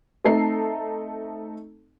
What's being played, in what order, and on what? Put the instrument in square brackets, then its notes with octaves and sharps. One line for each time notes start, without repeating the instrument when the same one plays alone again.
[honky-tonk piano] A3 C4 D#4 A4 A#5 C7